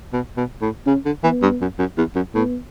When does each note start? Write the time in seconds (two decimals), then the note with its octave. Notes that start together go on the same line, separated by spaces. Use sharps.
0.13 B2
0.37 B2
0.62 A2
0.86 C#3 C#4
1.06 D3
1.24 E3 B3
1.43 G2
1.61 F#2
1.79 F#2
1.98 E2
2.15 F#2
2.35 A2 B3